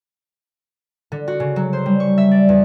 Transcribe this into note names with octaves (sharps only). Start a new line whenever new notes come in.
D3
F#4
C#3
F#3
C5
G3
C#6
E5
D5
E2